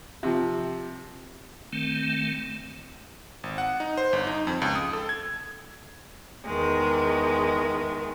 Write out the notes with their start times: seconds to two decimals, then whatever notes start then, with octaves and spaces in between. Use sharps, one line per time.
0.23 C3 F3
1.73 D#3 A3 C4
3.44 G#1
3.58 F#5
3.80 D#4
3.97 C5
4.13 G1
4.27 D#4
4.47 F2
4.62 C#2
4.75 D#6
4.93 A4
5.09 G#6
6.44 E2 D#3 G#3